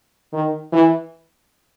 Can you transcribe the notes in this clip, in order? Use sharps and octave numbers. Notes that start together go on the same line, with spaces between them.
D#3
E3